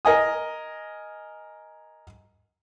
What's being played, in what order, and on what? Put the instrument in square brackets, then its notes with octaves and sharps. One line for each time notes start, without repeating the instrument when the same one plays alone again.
[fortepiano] A#4 D#5 G#5 D#6